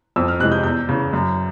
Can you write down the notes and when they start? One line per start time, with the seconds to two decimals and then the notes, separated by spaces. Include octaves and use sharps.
0.16 F2 E6
0.28 F6
0.40 C3 E3 G#3 F#6
0.52 G6
0.64 E2 G6
0.89 C#3 E3
1.13 F#2